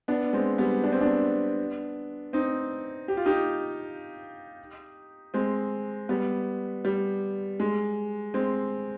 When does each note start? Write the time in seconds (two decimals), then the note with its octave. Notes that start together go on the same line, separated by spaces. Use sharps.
0.08 B3 D4
0.33 G#3 C4
0.58 G3 B3
0.84 D4
0.92 C4
1.01 B3 D4
2.33 C4 D#4
3.08 G4
3.17 F4
3.26 D#4 G4
5.34 G#3 C4
6.09 G3 B3
6.85 G3
7.60 G#3
8.34 G#3 C4